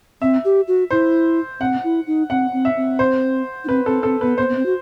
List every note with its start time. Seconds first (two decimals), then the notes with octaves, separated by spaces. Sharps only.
0.22 C4 E5
0.45 G4
0.68 F#4
0.90 E4 C5
1.60 C4 F#5
1.84 E4
2.07 D#4
2.30 C4 F#5
2.53 C4
2.65 E5
2.77 C4
2.99 C5
3.64 D#4
3.68 C4 B4
3.86 C4 A4
4.03 C4 A4
4.21 B3 B4
4.38 B3 C5
4.48 B3
4.56 C4
4.66 F#4